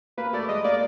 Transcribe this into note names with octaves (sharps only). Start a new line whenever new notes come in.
A#3 B4
A3 D5
G#3 D#5
A#3 D5